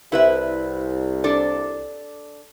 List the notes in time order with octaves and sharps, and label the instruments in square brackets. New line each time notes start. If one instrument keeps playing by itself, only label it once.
[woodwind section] C2 [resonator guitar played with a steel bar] E4 B4 E5
[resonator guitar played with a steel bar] D4 A4 D5